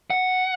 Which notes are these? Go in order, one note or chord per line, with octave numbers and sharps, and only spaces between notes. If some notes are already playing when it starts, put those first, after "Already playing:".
F#5